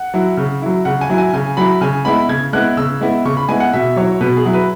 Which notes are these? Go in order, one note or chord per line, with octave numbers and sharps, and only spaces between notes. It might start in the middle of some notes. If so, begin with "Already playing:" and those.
Already playing: F#5
F#3 E4
C#3
F#3 E4
C#3 F#5
G#5
F#3 E4
G#5
C#3 G#5
F#3 E4 B5
C#3 G#5
G#3 B3 E4 B5
C#3 G#6
G#3 B3 E4 F#6
C#3 E6
G#3 B3 E4
C#3 C#6
B5
G#3 B3 E4 G#5
F#5
B2 E5
F#3 E4 C#5
B2 B4
G#4
F#3 E4
B4